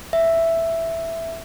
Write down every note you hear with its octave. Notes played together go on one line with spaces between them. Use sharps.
E5